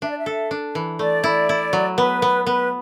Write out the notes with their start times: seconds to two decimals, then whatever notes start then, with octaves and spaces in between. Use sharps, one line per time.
0.02 D4 E5
0.11 D5
0.18 E5
0.26 A4
0.51 D4
0.75 E3
0.99 A3 D5
1.24 E4
1.49 E4
1.73 F#3
1.97 B3 B4
2.22 B3
2.46 B3 B4